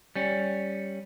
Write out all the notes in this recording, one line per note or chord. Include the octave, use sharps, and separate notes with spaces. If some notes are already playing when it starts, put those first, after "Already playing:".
G3 C#4